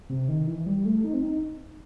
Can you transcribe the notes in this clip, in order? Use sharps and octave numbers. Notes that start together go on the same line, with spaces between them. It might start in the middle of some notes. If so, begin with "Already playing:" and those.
C3
D#3
E3
G3
A3
D#4
C4
D#4